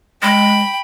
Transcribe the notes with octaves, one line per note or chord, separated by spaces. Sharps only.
G#3 G5 B5